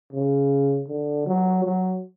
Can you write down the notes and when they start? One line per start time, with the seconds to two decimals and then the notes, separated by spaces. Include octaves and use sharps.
0.13 C#3
0.89 D3
1.26 F#3
1.65 F#3